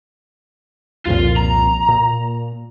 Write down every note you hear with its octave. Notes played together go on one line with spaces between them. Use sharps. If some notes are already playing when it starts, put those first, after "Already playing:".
C2 F2 A#2 F4
A#5
A#2